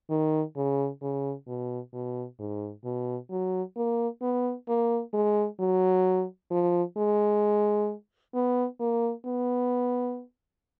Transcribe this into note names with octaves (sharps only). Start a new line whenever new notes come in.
D#3
C#3
C#3
B2
B2
G#2
B2
F#3
A#3
B3
A#3
G#3
F#3
F3
G#3
B3
A#3
B3